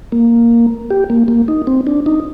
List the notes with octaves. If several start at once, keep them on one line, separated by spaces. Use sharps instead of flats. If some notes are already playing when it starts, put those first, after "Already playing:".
A#3
G4
A#3
A#3
D#4
C4
D4
D#4